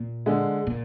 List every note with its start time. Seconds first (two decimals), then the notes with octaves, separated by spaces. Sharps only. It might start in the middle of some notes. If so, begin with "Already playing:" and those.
Already playing: A#2
0.26 D3 G#3
0.67 A#2